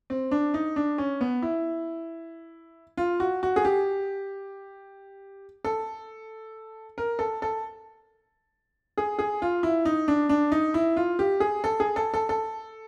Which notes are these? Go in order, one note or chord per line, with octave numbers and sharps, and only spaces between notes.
C4
D4
D#4
D4
C#4
B3
E4
F4
F#4
F#4
G#4
G4
A4
A#4
A4
A4
G#4
G#4
F4
E4
D#4
D4
D4
D#4
E4
F4
G4
G#4
A4
G#4
A4
A4
A4